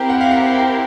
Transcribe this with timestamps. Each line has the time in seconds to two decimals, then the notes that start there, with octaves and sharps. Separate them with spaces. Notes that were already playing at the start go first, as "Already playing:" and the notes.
Already playing: C4 E4 G4 A#4 G5
0.09 F#5
0.21 F5
0.31 F#5
0.54 G5